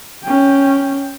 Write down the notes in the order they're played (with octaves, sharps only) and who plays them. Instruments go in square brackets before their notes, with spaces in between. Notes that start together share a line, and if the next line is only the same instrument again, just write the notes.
[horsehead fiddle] C#4 G5